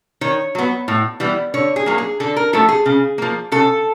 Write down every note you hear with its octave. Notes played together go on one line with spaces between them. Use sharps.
D#3 C#5
F#3 B3
A2
E3 G3 B3
D3 C#5
G#4
F#3 A#3
G#4
D3 A4
A#4
F3 A3 A4
G#4
C#3
F3 A#3
C#3 A4